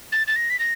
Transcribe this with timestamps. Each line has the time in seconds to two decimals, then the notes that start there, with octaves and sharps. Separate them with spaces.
0.12 A6
0.27 A6
0.36 A#6
0.50 B6
0.59 A#6